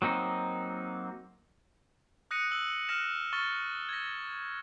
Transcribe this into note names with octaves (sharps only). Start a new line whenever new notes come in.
F#3 A#3 C4 D#4
D#6 F#6 A#6 C#7 D#7
E6 F#7
F6 F#6 A#6 E7
C#6 F6 A6 G7
G#6 A#6